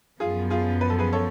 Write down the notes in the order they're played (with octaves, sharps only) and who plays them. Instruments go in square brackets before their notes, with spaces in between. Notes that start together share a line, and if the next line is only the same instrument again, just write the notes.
[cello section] F#2 F3 B3 [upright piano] F4 G#4
[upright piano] F4 G#4
B4
A4
G#4 B4
A4 C#5